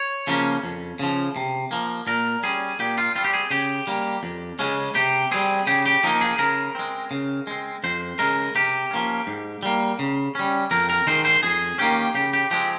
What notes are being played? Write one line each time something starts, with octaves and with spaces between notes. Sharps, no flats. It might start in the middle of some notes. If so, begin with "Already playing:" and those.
Already playing: C#5
C#3 F3 A#3 C#4
F2
C#3 F3
C3
F3 A#3
A#2 A#4
G3 C#4 G#4
A#2 G4
F4
G3 C4 F4
G4
G#4
C#3 G4
G3 A#3
F2
C#3 G#3 C#4
C3 G4
G3 C4 G#4
C#3 G4
G4
F3 A#3 D#4
G#4
C#3 A#4
G#3 C4
C#3
G#3 C4
F2 C5
C#3 G#3 A#4
C3 G4
F3 A#3 C#4
G#2
G3 A#3
C#3
G3 C#4
F2 A#4
A#4
D#3 G#3 C5
C5
F2 G#4
D#3 A#3 C#4 G4
C#3 G4
G4
F3 G#3 C4 G4